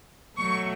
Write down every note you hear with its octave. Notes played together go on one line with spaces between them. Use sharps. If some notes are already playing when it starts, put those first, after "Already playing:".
B2 F#3 A3 C#6